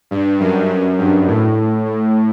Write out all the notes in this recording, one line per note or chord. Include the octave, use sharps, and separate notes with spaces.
G2
F#2
F#2
G2
A2
A2